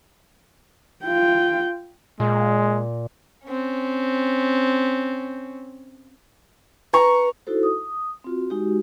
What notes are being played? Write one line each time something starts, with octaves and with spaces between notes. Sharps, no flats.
F4 G5
A#2 G#3
C4 C#4
B4 A#5 C#6
D#4 E4 F#4 A4 C5
D#6
C4 F4 F#4
G#3 D#4 F#4 G4